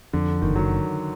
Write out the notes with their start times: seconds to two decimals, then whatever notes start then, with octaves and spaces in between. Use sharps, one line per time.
0.13 F2 D3
0.42 F#1 D#3
0.56 F#3